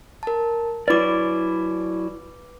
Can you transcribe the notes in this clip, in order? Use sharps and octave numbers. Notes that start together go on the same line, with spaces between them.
A#4 A5
F#3 E4 B4 D5 D6